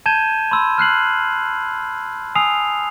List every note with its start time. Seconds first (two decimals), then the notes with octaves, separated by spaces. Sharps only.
0.06 A5 G6 G#6 D#7 E7 G7
0.51 B5 C6 E6
0.78 F6 F#6 C7 F#7
2.35 G#5 D#6 E6 C7 F7